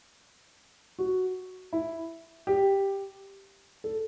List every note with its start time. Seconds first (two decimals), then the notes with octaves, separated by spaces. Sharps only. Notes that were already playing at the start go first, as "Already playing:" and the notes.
0.99 F#4
1.73 E4
2.47 G4
3.84 A4